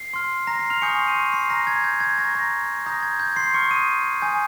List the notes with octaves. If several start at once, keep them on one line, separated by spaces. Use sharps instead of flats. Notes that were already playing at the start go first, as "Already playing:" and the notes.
Already playing: C7
C6 F6
A#5 A#6
C6 C7
F6 F7
G#5 C#6 D#6 G6 C#7
C6 C7
D#7
C#6 C#7
C6 C7
A#5 F6 A#6
G#6
G6
G#6
A#5 C#6 F6 A#6
A#5 A#6
A#5 D#6 G6 A#6
G#6
G6
C6 C7
C6 C#6 F6 C#7
D#6 D#7
G#5 D#6 G6